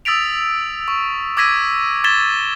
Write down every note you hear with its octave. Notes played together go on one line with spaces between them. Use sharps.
D#6 E6 A6 B6 D7 F7
C#6
D6 E6 G#6 A#6 B6 D#7
C#6 G#6 A6 B6 E7 G7